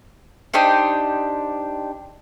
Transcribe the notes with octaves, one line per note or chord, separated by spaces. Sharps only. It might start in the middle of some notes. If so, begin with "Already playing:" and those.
D4 D#4 G4 C5